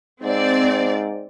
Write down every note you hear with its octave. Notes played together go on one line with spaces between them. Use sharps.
G#2 C4 D5